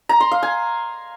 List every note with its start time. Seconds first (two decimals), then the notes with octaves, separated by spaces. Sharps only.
0.09 A#5
0.20 C6
0.32 F5
0.43 G#5